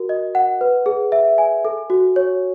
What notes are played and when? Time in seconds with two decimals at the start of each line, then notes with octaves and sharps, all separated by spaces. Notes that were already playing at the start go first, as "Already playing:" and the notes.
Already playing: F#4 A#4
0.09 D#5
0.35 F#5
0.61 B4
0.86 G#4
1.12 E5
1.38 G#5
1.65 A4
1.90 F#4
2.16 C#5